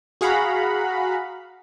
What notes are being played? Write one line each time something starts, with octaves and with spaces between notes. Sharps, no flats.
F#4 G#4 F5 F#5 A#5 B5